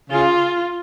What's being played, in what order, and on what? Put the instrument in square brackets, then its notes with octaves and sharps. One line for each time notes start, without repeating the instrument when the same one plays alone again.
[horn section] C#3 [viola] F4